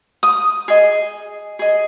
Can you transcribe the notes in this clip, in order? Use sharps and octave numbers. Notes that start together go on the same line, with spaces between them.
D#6
G#4 D#5
G#4 D#5